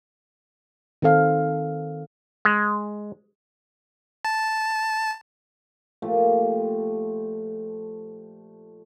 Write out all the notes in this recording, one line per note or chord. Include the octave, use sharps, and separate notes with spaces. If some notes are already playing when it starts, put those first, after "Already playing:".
D#3 C4 A4 F5
G#3
A5
A#2 F3 A3 G4